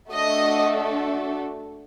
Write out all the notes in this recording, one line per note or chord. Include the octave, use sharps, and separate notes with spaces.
A3 D4 F#4 A4 D#5